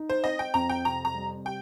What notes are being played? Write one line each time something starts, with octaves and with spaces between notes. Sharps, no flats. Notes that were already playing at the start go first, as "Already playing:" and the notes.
Already playing: D#4
C5
C4 D#5
G5
F2 A#5
G5
C3 A#5
A#5
G3
G4 G5